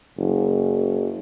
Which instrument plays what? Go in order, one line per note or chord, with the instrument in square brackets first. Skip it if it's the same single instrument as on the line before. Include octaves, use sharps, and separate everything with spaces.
[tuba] F#1